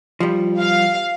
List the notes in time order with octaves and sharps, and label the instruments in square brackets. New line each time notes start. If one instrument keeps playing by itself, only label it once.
[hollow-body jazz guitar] F3 G3
[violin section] F5